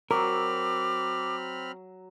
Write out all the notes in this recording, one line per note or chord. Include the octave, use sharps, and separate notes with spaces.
F#3 C4 A#4 B5 D6 F6